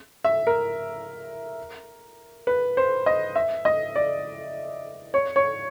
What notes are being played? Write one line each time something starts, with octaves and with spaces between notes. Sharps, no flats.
E5
A#4
B4
C5
D#5
E5
D#5
D5
C#5
C#5